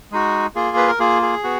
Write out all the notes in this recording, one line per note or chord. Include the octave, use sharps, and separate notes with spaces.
G#3 D#4 F#4
A#3 F4 G#4
B4
A#4
A#3 F4 G#4
G#4
B3 F#4